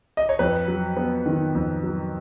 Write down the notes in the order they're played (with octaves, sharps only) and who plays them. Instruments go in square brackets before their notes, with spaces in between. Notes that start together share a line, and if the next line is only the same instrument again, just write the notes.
[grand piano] D#5
C#5
F2 B4
F#3
B3
D#3
F2
F#3